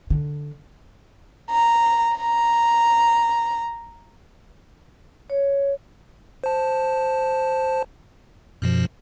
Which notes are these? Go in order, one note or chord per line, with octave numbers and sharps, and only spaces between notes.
D3
A#5
A#5
C#5
C5 A5
F#2 B2 F3